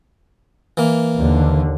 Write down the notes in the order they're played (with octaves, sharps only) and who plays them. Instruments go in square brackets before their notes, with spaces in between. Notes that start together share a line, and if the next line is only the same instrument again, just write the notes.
[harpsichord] E3 A#3
[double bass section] D#2 D3